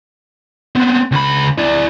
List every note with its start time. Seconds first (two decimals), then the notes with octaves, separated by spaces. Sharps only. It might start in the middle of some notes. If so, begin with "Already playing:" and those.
0.75 B3 C4
1.12 C#2 B5
1.58 E4 D5